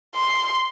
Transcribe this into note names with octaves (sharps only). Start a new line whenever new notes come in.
C6